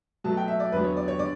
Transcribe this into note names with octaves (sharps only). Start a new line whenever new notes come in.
B2 F#3 A3 A5
G5
E5
D5
E2 D3 F#3 B3 B4
C#5
D5
C#5
D3 D5